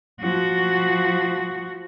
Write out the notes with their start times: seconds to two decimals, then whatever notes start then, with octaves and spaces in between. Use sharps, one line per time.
0.21 F3 F#4